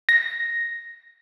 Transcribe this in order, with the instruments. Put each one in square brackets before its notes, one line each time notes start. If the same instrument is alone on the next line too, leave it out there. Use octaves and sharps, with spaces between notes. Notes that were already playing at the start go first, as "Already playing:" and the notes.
[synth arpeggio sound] A#6